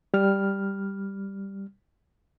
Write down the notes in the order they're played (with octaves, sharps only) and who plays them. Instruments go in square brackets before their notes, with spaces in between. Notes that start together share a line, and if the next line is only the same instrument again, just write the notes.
[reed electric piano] G3 F6